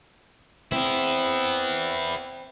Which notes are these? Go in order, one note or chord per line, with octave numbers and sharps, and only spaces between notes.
B3 C4 E4